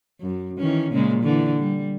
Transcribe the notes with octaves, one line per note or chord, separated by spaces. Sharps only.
F#2
D#3 E3 C#4
A#2 C#3 G#3
D3 E3
G3